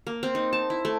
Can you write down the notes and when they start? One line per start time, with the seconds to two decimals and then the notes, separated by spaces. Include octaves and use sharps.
0.07 A#3
0.23 C4
0.35 D#4
0.53 A5
0.70 E4
0.85 A3